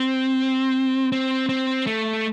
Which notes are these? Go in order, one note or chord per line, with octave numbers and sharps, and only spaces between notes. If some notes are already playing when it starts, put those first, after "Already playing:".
Already playing: C4
C4
C4
A3